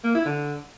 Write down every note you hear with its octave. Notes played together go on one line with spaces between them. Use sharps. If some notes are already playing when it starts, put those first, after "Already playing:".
A#3
E4
D3